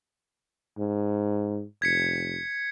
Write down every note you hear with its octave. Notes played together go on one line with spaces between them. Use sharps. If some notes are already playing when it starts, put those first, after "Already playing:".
G#2
F1 G#6 B6 C#7